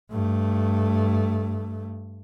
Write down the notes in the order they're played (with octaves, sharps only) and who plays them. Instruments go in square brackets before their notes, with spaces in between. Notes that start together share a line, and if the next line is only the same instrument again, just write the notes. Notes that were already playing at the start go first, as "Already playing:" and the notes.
[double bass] G2 A3